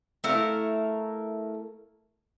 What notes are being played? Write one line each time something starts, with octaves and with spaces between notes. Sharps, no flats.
A3 E4 A#4 F5